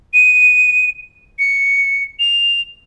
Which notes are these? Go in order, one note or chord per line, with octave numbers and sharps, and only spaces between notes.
D#7
C#7
F7